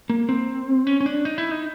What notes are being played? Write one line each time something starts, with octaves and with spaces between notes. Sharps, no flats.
A#3
C4
C#4
C#4
D4
D#4
E4
D#4